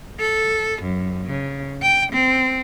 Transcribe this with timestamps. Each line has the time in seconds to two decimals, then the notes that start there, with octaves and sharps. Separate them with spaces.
0.20 A4
0.82 F#2
1.26 C#3
1.82 G5
2.13 C4